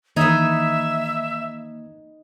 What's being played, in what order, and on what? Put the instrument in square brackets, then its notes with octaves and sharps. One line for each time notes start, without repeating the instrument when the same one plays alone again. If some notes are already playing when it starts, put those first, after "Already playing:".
[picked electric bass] D#3 E3 [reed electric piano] A#3 G#6 [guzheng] D#4 B4 [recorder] E5